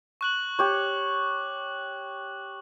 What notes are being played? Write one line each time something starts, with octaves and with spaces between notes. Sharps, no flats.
C#6 F#6 F#7
G4 C#5